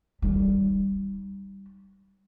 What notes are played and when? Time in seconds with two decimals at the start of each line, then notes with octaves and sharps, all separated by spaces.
0.22 G3 D#4